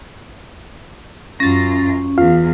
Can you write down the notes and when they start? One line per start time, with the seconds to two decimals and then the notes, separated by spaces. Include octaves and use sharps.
1.40 F#2 C#4 F4 A6 A#6
2.18 E2 F4 F5